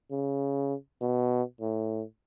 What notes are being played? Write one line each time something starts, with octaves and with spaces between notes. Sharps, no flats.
C#3
B2
A2